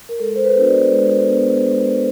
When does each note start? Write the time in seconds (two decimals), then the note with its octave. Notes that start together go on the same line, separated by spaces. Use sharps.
0.09 A#4
0.20 G#3 A4
0.36 C5
0.44 B4
0.55 B3 D4 F#4
0.68 D5
0.91 G#3
1.28 B3 D4 F#4
1.63 G#3